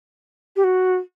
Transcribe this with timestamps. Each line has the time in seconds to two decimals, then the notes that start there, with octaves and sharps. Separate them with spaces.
0.56 G4
0.64 F#4